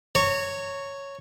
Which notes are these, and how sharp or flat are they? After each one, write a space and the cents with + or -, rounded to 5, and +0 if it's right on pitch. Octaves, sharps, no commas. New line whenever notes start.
C#5 +0 A#5 -30